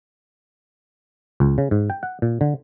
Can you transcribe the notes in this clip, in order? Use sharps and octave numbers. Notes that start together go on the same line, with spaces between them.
C#2
C#3
G#2
G5
F#5
A#2
D3